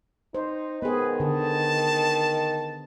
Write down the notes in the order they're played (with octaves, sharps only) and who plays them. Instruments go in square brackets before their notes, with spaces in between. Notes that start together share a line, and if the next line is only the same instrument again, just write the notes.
[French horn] D#4 [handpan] C5
[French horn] D#3 [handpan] B3 G#4 [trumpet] B4
[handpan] D3 [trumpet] A5